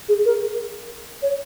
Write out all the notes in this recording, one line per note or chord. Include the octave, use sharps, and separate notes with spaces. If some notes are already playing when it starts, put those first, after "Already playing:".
G#4
A#4
C#5